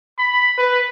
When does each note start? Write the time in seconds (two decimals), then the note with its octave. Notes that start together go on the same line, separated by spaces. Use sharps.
0.18 B5
0.58 B4